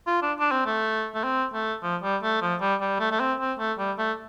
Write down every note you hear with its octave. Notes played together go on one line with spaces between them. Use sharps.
F4
D4
D4
C4
A3
A3
C4
A3
F3
G3
A3
F3
G3
G3
A3
A3
C4
C4
A3
G3
A3